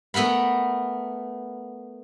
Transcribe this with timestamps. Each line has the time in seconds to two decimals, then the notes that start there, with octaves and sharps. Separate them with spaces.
0.14 A3 B3 A#4 F#5 B5